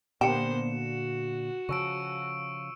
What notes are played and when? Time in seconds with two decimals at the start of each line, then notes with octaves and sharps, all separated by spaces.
0.21 A#2 D3 A#3 B3 G4 C5 C#7 E7
0.72 F#4
1.69 C#3 F3 C#6 E6 D7